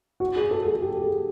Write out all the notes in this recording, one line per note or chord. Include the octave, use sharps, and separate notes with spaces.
F#4
G#4
A4
A4
G4
G#4